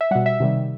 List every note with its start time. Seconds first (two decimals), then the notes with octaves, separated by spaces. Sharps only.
0.01 E5
0.11 G3 F#5
0.15 B2
0.26 E5
0.40 C3 D#3 G3